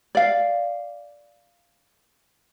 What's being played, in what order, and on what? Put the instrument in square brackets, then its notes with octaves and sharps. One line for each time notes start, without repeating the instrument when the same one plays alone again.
[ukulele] D5 F5